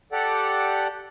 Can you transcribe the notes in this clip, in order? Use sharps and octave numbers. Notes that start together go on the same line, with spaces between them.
G4 A4 D5 F#5